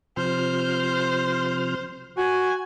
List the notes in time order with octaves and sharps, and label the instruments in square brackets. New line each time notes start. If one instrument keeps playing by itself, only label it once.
[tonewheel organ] C3 F3 F6 [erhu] C5
[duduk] F#4 [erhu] G#5